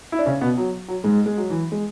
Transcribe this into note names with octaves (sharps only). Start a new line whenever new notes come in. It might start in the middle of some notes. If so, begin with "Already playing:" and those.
E4
D4
C#3 C#4
B2 B3
F#3
F#3
G#2 G#3
G#3
F#3
E3
G#3